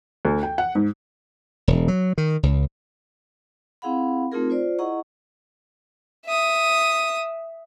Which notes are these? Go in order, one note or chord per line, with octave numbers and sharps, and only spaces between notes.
D2
G5
F#5
G#2
E1
F#3
D#3
C#2
C4 E4 G#4 F5 F#5 B5
A3 C4 D#4 F4 G#4 A#4
F4 C5 D5
E4 G#4 D#5 F#5 A#5 C#6
E5 D#6